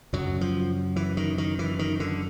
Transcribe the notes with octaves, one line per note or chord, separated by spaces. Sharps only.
F#2 C#3 F#3
F3
E3
D#3
D#3
E3
D#3
D3